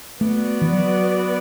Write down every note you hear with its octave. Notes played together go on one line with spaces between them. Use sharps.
A3 B3 F#4 B4 D5
E3
F#3